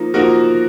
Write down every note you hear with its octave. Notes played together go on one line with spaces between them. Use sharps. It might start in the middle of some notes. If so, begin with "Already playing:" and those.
Already playing: F3 A#3 D#4
F3 A#3 D#4 F#4 A#4